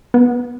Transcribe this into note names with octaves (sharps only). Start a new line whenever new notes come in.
B3